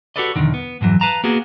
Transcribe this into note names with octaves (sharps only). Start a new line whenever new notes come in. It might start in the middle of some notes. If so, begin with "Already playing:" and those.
F#4 G4 A4 B4 D5 D#5
B1 E2 D3 D#3
B3
F2 G#2 E3 F#3
B4 F5 A5 A#5
A#3 B3 F#4 G#4